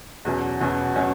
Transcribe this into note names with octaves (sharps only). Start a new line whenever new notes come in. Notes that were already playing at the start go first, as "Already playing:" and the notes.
E2 B2 F#3 C#4
E2 B2 F#3 C#4
B2 F#3 C#4